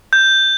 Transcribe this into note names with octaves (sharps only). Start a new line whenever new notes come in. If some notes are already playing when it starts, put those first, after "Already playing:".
G6